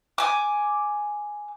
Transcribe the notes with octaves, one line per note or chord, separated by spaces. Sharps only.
G#5 D6